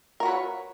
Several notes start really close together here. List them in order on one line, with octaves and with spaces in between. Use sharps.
A#4 F#4 B4 C#5